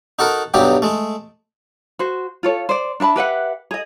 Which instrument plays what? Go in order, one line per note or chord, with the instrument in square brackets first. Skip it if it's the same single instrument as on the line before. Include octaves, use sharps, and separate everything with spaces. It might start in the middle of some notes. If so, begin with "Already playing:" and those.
[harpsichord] D#4 F#4 A4 A#4
B1 G2 F#3 D#4 G4
G#3 A3
[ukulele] F#4 C5
F4 A4 C#5
C5 D5
D4 E5 A5 B5
G4 B4 E5 F#5
G#4 D#5